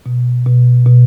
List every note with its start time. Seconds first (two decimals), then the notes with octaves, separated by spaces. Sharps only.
0.06 B2
0.46 B2
0.86 B2